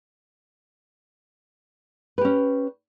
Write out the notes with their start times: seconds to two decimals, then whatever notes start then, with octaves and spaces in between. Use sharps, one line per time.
2.18 B4
2.21 G4
2.25 C#4